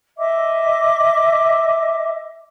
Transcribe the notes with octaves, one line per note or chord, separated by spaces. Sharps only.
D#5 E5 D6